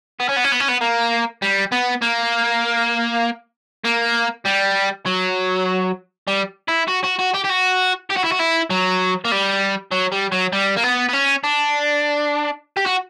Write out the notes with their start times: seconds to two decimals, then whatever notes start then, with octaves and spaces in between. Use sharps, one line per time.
0.20 B3
0.29 C#4
0.36 B3
0.44 C#4
0.52 B3
0.60 C#4
0.69 B3
0.81 A#3
1.42 G3
1.72 B3
2.02 A#3
3.85 A#3
4.45 G3
5.06 F#3
6.27 G3
6.68 E4
6.88 F#4
7.04 F#4
7.19 F#4
7.34 G4
7.44 G4
7.49 F#4
8.10 G4
8.17 F#4
8.24 E4
8.32 F#4
8.40 E4
8.70 F#3
9.25 A#3
9.32 G3
9.91 F#3
10.12 G3
10.32 F#3
10.53 G3
10.76 A#3
10.83 B3
11.09 B3
11.13 C#4
11.44 D4
12.77 G4
12.86 F#4